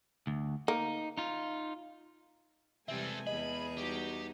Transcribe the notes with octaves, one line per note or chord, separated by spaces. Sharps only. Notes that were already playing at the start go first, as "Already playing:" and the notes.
D2
A#3 D#4
D#4 F4
C3 E3 G3 G#3 C4 A4 E5 G#5
E2 G#4 D#5 B5
G3 D#4 F#4 G4